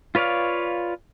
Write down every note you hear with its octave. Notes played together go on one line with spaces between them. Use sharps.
F4 B4 C#5 D5 F5